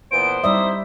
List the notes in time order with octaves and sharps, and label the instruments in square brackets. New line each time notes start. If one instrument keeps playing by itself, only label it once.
[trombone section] A#2 E3 B3 [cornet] C5 [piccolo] D7
[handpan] G3 D5 E5 [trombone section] C4 D#4 E4 [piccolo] D#6